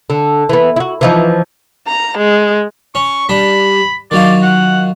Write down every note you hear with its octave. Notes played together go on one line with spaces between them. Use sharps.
D3
E3 B3
E4 F#4
E3 F3 D#4
A#5
G#3
C#4 C#6
G3 D4 B5
D#3 F#3 F4 D5
F#5